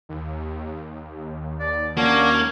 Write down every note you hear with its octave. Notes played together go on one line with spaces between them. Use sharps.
D#2
D5
A#3 C#4 D4 F#4